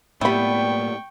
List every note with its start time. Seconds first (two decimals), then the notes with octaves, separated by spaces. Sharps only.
0.21 A2 G3 A#3 B3 E4 G5 B5 C#6